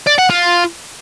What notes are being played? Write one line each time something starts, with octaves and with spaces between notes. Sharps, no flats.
D5
F#5
F4